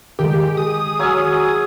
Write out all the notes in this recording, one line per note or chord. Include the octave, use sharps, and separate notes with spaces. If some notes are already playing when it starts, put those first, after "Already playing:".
D#3 G#3 G4
G#4 D#6
F#3 G#5 E6 F6